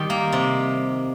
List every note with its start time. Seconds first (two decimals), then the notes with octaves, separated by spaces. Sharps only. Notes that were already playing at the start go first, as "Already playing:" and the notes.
Already playing: D#3 G3 G4
0.10 A#3
0.32 C3